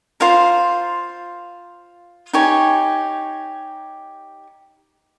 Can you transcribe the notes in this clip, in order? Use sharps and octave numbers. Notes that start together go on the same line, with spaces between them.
F4 C5 F5 A#5
D#4 G4 C#5 G#5